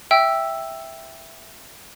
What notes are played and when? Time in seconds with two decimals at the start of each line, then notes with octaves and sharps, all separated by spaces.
0.11 E5 G5 E6